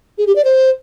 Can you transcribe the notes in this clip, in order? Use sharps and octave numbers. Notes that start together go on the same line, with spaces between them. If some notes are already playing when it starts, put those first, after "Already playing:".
G#4
G4
D5
C5